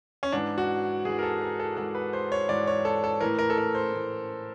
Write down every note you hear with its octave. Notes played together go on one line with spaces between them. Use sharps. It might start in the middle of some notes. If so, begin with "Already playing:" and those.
C#4
G#2 E3 D4
F#4
G#2 E3 G#4
A#4
A4
A#4
A4
G#2 E3 A4
B4
C5
C#5
G#2 E3 D5
C#5
A4
A4
A2 E3 A#4
A#4
A4
A#4
C5
A2 E3